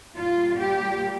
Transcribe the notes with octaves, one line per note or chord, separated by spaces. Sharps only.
A#2 G3 F4
G4